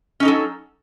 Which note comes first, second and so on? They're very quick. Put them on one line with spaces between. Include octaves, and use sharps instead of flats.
C#4 D#4 A4 F#3